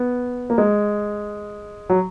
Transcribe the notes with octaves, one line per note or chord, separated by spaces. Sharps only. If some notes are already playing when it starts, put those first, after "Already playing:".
Already playing: B3
A#3
G#3
F#3